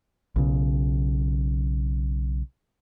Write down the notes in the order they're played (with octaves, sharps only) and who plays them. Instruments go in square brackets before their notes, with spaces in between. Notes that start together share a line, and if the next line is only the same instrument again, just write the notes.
[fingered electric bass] B1 C#3